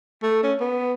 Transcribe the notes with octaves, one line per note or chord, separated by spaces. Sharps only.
A3
C#4
B3